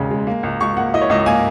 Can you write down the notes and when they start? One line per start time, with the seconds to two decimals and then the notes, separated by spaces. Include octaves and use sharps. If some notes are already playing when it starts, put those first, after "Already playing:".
Already playing: E1 D#2 C#3 G#3
0.11 G#3
0.27 A#3
0.43 C#2
0.60 C#2 C#6
0.77 A#3 F#5
0.94 E4 D#5
1.01 C#5
1.10 C#2 D#5
1.26 A#3 G#5